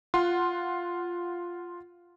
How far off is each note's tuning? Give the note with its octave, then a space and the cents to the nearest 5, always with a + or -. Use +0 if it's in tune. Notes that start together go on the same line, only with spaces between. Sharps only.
F4 +0 F#5 +0 C6 +10